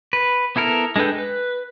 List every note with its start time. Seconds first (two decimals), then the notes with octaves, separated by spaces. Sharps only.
0.13 B4
0.56 B3 E4 A4 A#4 F6
0.96 G#3 D4 A4 B4 G5
1.18 B4